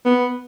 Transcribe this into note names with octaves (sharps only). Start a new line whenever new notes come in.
B3